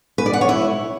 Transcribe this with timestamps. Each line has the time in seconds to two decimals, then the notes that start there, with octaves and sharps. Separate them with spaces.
0.18 B4
0.26 D5
0.33 F#5
0.41 C#5
0.49 E4